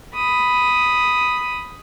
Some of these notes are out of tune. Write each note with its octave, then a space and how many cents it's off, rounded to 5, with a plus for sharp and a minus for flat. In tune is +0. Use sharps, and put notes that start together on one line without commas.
B5 +0 D#6 +0